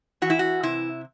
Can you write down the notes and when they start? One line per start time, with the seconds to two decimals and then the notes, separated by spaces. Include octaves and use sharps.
0.22 E3 F#4
0.30 E4
0.39 F#4
0.63 C3 E4